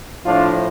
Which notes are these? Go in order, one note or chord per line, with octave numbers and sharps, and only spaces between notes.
A2 F3 D4 F4